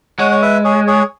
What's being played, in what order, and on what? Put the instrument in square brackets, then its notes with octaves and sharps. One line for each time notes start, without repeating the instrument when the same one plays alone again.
[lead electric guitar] G#3 [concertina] C#5 F#5
[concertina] C#5
B4 E5
G#4 C#5
G#4 C#5